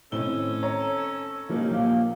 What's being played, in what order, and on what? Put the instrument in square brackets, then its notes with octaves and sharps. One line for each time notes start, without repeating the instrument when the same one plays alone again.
[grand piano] A2 G7 [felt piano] D#3 C4 D#4 [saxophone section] C#4 A4
[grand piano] C#5 A#5
[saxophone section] A#2 C#3 G3 [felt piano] F3 A#3 D#4
[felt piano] A#1 [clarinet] A#3